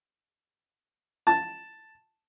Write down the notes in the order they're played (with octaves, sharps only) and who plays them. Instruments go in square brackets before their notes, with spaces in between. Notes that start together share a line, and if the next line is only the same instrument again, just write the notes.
[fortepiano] A5